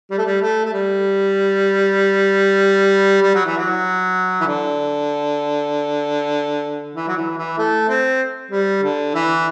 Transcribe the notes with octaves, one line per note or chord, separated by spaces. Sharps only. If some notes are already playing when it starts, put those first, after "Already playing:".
G3
A3
G3
A3
A3
G3
G3
F#3
E3
F#3
E3
D3
E3
F#3
E3
E3
A3
C4
G3
D3
E3